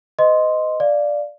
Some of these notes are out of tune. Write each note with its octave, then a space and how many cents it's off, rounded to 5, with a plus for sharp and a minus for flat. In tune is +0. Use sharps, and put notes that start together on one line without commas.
B4 +40 D#5 +0 C6 +0
D5 +0 F5 +0